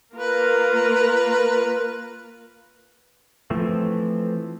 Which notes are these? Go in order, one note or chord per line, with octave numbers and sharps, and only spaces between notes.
A#3 F4 A#4 B4
E3 F3 A3 C4